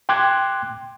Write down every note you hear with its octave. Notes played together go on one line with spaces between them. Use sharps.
G5 C6 D6 F#6 G#6